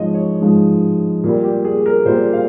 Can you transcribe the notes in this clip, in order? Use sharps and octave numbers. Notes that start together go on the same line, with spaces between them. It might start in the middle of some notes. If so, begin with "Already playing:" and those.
Already playing: G#2 F3 G#3 C#5 D#5
C#5
G#2 F3 G#3
A#2
G3
G4
G#4
A#4
A#2 G3 C5
F5